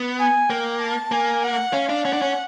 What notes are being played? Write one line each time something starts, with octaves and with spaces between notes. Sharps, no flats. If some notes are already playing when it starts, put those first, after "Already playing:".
Already playing: B3
G#5
A#3 G5
A5
A#3 G#5
F#5
C#4 F5
D4
C#4 F#5
D4
C#4